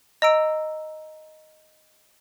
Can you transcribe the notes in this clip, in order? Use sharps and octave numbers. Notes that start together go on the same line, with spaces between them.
D#5 A#5 E6 D7